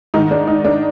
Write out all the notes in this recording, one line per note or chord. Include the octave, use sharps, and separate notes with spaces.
G#2 D#3 D#4
D4
D#4
D4